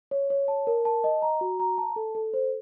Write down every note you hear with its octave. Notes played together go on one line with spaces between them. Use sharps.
C#5
C#5
A5
A#4
A5
D#5
A#5
F#4
A#5
A5
A4
A4
C5